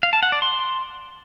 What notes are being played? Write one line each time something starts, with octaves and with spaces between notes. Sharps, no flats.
F5
A5
F#5
D5
C6